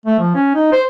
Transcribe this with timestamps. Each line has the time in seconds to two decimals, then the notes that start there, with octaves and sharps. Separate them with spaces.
0.06 A3
0.19 F3
0.35 C#4
0.55 D#4
0.72 C5